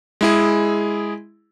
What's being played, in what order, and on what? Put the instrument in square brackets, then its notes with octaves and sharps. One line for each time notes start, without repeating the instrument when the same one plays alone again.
[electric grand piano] G#3 E4 G#4